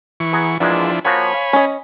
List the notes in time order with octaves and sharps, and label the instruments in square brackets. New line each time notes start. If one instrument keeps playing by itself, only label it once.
[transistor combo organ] E3 C#6
[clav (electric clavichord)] B3 G#4 A#5
[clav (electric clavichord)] E2 A#2 G#3 [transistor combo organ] F3 D4 E4
[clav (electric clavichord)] F3 A#3 F#4 [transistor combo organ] C#5 G#5 B5
[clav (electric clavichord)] F5
[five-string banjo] C#4 D#5